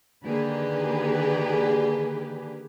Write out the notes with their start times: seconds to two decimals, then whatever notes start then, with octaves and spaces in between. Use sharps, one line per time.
0.25 D3 D#3 A#3 G4 G#4 B4